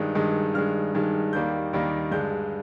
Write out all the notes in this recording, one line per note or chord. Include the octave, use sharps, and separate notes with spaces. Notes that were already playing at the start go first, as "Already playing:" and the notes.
Already playing: G2 D#3 G#3
G2 D#3 G#3
G2 D#3 G#3 F6
G2 D#3 G#3
D#2 D#3 G3 A#3 G6
D#2 D#3 G3 A#3
G2 D3 G#3 G6